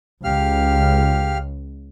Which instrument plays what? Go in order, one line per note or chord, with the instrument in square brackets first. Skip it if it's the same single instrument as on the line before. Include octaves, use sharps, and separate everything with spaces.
[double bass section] C#2 [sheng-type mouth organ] G4 F5 F6